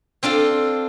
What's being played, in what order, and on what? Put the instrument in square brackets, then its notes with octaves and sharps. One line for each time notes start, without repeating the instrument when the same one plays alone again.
[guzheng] C4 D4 F4 A4